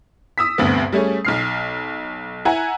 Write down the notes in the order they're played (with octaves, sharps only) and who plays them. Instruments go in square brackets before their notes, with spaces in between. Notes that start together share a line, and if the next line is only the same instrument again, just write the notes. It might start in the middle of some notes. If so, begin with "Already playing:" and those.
[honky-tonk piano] D#6 E6 B6
D2 G2 C3 B3
G3 A3 C#4 G#4
B1 F6 C7
E4 F#5 G#5 A#5